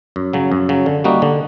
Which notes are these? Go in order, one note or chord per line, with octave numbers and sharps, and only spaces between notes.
F#2
C#3 F#3
F#2
C#3 F#3
D3
G3 A#3 D#4 F#4
D3